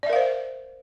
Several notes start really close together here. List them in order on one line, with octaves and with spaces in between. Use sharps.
D5 E5 A#4 F5 C5